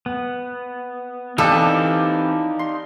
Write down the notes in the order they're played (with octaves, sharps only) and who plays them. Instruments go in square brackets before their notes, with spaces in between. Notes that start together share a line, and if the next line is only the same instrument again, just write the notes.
[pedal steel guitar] B3
[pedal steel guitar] E3 C4 [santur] D4 G4 [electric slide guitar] D#4 F5 [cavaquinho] A4
[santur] C6